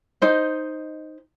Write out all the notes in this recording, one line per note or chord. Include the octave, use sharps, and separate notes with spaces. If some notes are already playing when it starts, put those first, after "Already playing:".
D#4 C5 D#5